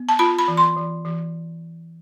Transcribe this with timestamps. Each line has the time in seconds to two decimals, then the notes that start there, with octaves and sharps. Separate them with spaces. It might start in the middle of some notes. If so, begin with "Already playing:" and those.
Already playing: B3
0.09 A5
0.19 F4 B5
0.39 B5
0.48 E3
0.57 C6
0.77 E3
1.05 E3